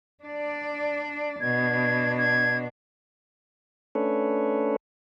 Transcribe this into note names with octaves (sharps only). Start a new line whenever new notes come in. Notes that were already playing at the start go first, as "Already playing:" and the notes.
D4 D5
B2 D4 G#6
G#6
A3 C#4 D4 A4 B4 C#5